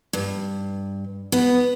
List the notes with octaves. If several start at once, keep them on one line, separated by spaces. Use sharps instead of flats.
G2
B3